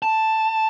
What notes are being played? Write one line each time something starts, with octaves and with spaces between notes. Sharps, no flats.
A5